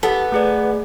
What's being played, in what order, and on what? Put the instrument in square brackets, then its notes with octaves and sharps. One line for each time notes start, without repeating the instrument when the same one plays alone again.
[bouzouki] B3 [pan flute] G4 [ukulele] A4
[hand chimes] A3 G#4 D5 [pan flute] B4